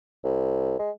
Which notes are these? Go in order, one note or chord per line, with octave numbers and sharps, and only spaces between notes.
C2
G#3